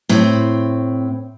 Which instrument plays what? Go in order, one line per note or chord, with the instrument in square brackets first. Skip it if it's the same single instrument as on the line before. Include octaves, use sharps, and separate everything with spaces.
[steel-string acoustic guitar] A2 C4